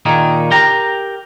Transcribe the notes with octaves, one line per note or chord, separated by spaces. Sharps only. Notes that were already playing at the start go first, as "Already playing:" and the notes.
A#2 D#3 A#3 G#4
G4 A#4 A#5